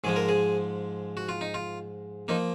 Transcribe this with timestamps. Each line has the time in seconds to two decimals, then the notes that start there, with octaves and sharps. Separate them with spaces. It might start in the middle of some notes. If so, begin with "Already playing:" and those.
0.04 G#2 F3 G#3 G#4
0.16 A#4
0.29 G#4
1.17 F#4
1.29 F4
1.41 D#4
1.54 F4
2.28 F3 A#3 D#4